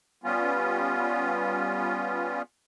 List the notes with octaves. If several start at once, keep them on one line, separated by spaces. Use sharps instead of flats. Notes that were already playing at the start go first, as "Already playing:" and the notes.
G3 B3 C#4 F4